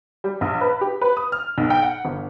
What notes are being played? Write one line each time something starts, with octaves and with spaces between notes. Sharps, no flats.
G3
A#1
B4
G4
B4
D#6
F6
B1
G5
F#5
G1